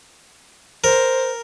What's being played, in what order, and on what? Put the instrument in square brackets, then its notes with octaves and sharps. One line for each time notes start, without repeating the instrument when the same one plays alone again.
[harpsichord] A#4 [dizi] C5